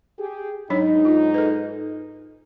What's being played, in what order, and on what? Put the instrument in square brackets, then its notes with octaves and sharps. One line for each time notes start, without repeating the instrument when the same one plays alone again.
[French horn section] G4 G#4
[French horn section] G#2 D#4 [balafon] F#3 D4 C#5
[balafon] F4
A4 B4